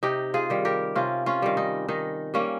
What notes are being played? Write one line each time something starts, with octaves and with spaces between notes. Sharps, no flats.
C3 D#4 G4
F4 G#4
D#3 G3
G4 A#4
C3 C#4 F4
C#4 F4
D#3 G3
D#4
D#3 D#4
G3 A#3 C#4